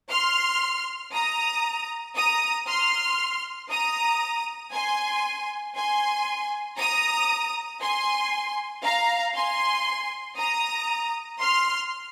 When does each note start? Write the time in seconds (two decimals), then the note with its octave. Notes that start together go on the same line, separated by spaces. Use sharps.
0.10 C6 F6
1.13 A#5 D#6
2.16 A#5 D#6
2.67 C6 F6
3.70 A#5 D#6
4.73 G#5 C6
5.76 G#5 C6
6.79 A#5 D#6
7.81 G#5 C6
8.84 F5 A#5
9.35 G#5 C6
10.38 A#5 D#6
11.40 C6 F6